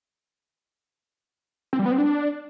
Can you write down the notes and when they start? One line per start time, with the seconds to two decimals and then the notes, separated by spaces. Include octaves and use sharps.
1.73 C4
1.79 G3
1.85 B3
1.92 C4
1.98 D4